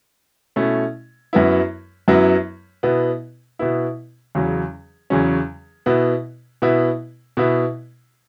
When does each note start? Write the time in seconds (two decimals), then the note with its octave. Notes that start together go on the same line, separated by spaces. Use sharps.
0.56 B2 A3 C#4 E4
1.33 F#2 F#3 B3 E4
2.08 F#2 F#3 B3 E4
2.83 B2 B3 E4
3.59 B2 B3 E4
4.35 E2 C#3 F#3 C#4
5.10 E2 C#3 F#3 C#4
5.86 B2 B3 E4
6.62 B2 B3 E4
7.37 B2 B3 E4